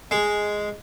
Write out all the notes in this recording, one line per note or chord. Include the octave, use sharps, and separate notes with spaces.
G#3